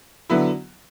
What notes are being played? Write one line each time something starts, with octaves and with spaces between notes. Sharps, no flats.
D3 F#3 B3 E4